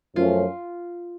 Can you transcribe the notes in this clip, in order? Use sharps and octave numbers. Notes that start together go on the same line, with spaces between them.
F#2 F3 A3 C#4 F4